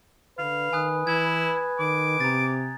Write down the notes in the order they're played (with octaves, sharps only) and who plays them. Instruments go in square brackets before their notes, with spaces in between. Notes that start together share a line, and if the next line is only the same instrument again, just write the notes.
[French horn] D3 [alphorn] B4 [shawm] F5
[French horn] D#3 [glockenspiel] G#5 D#6 F#6
[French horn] E3 [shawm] E4 [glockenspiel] G#6
[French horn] D#3 [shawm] D6
[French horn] C3 [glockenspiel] A#5 A6